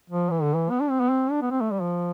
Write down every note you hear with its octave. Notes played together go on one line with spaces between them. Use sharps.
F3
E3
D3
E3
B3
D4
C4
B3
C4
D4
B3
C4
A3
G3
F3